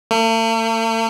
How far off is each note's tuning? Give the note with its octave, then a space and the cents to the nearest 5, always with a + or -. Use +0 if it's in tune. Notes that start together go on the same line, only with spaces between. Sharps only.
A3 +45